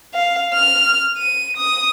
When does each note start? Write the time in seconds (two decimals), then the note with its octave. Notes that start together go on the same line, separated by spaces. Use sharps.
0.14 F5
0.54 F6
1.17 D#7
1.57 D#6